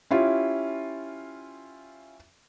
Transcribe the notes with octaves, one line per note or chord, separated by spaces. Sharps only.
C#4 E4 F4 G4